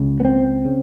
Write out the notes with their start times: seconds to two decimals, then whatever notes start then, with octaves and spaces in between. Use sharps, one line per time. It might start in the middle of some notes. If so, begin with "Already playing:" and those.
Already playing: C#2 C#3
0.20 B3
0.25 C4
0.65 C#3